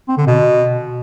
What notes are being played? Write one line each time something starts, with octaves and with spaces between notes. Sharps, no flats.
C4
D3
B2